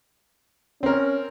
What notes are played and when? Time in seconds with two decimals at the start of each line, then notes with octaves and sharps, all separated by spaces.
0.83 C4 C#4 A#4